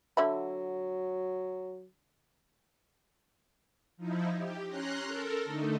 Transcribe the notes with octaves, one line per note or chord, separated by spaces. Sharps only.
D3 F#3 E5 B5
F3 D#4 E4
G4
C#4 A#5 C6 F#6
A4 A#4
D3 A3 D#4